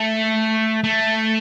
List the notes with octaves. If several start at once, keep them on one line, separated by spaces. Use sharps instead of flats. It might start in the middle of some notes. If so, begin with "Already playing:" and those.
Already playing: A3
A3